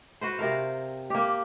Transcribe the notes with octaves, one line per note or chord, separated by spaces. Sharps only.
F#4 B4 C5
C3 A#4 F5
A#3 G4